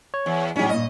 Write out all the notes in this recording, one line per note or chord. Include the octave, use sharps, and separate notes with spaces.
C#5
E2
A2 F#3 G3 C#4 D#4 G#4
G2 A#2 D#5